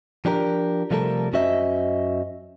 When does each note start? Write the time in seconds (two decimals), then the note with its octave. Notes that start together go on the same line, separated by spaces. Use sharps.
0.25 F3 D4 G4 A#4
0.91 C3 F3 G3 A3 A4 A#4
1.33 F#2 C#4 F#4 C5 D#5 E5